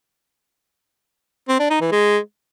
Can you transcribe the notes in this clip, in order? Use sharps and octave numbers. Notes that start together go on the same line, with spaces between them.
C4
D4
D#4
E3
G#3